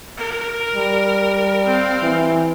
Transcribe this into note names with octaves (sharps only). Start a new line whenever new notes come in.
A#4
G3
C4 F5
E3